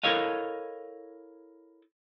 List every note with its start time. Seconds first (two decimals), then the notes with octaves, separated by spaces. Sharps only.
0.04 E4 A4 A#4 C#5 D#5 F5